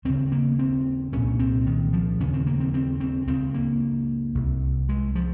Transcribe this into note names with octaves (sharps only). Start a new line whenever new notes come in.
D#2 C#3 C4
A#3
C4
C2 A#2 C#4
C4
D#3
F3
D#2 C#3 C#4
C4
A#3
C4
C4
C4
C#2 C#3 C4
A#3
C2 C3
G#3
F3